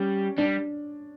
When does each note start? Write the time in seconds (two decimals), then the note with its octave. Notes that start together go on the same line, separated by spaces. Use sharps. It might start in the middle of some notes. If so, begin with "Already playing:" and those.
Already playing: G3 C#4
0.38 G3 D4